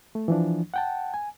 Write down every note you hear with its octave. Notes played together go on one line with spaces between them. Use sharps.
A3
E3 F3 D4
F#5 G5 A5
G#5